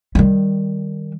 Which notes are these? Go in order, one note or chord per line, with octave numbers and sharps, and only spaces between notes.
D#3 G3